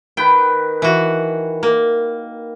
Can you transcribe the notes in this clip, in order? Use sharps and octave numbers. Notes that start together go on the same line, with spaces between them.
D#3 B4 G5
E3 F#4
A#3